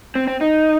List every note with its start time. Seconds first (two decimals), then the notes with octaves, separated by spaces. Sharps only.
0.15 C4
0.28 C4
0.41 D#4